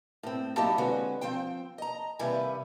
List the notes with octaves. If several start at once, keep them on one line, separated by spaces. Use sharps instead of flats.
A2 C4
F#3 A#3 D#4 E4 G4 A5
D3 G#3 C4 C#4 F#4 B4
F3 C4 C5 G5
D#5 A#5
D#2 C3 G3 E4 B4 G#5